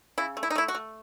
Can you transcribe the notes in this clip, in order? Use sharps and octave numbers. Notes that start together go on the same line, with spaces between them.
C#3 E4
A3
E4
D#4
A3 E4
F#4
A3